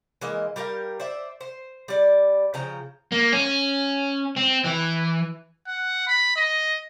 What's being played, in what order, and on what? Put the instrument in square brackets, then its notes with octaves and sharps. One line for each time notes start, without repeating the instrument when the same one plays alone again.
[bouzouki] E3 G#3 A#3 D#5
G3 G4 A#4 F5
C5 D5 E5
C5
G3 D5
C#3 F3 G5 A#5
[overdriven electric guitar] A#3
C#4
C4
E3
[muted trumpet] F#5
B5
D#5